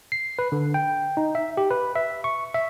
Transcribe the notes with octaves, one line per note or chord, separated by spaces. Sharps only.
C7
B4
D3
G5
D#4
E5
G4
B4
E5
C#6
E5